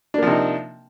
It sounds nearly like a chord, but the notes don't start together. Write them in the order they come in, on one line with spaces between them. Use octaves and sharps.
D4 A#3 F3 C3 D#4